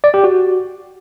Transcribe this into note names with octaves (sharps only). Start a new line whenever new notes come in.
D5
G4
F#4